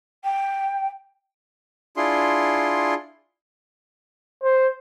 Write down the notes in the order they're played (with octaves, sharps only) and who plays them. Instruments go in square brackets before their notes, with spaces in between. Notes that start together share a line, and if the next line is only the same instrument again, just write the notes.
[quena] G5
[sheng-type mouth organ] D4 E4 F4 G#4 C6
[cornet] C5